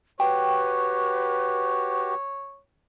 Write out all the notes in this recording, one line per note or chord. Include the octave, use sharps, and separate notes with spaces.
F#4 G4 B4 C#5 G5